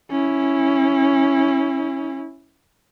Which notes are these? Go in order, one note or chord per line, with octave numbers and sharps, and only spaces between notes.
C#4 E4